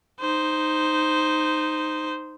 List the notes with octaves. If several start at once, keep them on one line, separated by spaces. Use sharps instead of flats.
D#4 C5